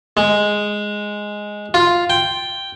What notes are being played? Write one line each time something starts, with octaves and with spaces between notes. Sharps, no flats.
G#3
F4
G5